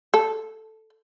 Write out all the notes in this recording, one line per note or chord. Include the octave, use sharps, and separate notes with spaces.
A4